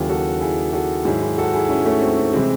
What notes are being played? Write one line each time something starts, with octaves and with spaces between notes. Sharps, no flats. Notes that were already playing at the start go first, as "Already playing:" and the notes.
Already playing: D#2 C#3 F#3 E4 G#4
F#4 A4
E4 G#4
F#4 A4
G#2 D#3 F#3 E4 G#4
E4 G#4
F#4 A4
E4 G#4
C#4 E4
A3 C#4
C4
C4
C3 E3 G#3 C4